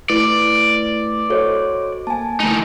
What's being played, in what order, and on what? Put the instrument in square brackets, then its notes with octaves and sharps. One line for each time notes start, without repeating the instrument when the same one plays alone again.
[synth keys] A3 E4 [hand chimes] B4 [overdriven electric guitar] D5
[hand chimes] F#4 C5 C#5 [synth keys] A4 D#5
[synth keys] A#3 [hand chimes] G#5 A5
[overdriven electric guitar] E3 D#4 [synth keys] A3